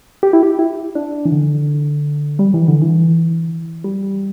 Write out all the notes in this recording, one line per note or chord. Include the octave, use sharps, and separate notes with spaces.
G4
E4
G4
E4
D4
E3
D3
G3
E3
D3
E3
G3